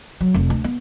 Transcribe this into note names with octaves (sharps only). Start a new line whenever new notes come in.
F#3
F1
D2
B3